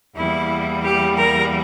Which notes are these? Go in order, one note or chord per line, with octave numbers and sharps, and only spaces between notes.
E2 E3 G3 A#3 E4
G4
A#4